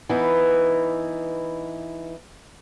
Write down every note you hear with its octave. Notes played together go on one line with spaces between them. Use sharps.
E3 B3 D#4 E4